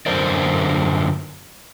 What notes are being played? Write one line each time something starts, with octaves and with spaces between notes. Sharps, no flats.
F#2 D3 E3 A#4 C5 D5